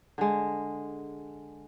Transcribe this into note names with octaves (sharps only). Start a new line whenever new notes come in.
D3 G#3